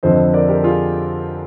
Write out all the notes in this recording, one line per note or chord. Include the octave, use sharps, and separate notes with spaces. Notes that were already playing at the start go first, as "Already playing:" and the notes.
F2 D3 F3 C5 D#5
A#4 D5
G4 A#4
F4 G#4